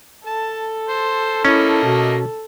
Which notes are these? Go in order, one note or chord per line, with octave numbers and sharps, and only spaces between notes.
A4 A5
C5
A3 A#3 C#4 E4 D#5
B2